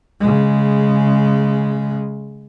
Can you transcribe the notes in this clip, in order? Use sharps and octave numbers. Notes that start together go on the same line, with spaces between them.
C#3 G#3